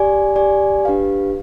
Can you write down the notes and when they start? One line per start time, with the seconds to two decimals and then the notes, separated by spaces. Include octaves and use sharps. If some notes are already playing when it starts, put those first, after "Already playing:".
Already playing: G4 D5 G#5
0.36 G4 D5 G#5
0.85 D4 G4 B4 F5